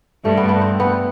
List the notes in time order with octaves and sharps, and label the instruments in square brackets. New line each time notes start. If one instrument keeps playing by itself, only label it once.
[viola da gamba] G2 G3 [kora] A3
[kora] B3
B3
C4
B3